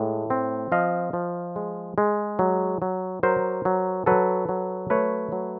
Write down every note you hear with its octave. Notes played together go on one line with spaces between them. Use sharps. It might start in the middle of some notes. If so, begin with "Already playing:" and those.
Already playing: A2 G#3
C4
F3 D#5 F5
F3
G#3
G#3
F#3
F#3
F#3 A#4 C5
F#3
F#3 A4 B4
F#3
A3 B4 C#5
F#3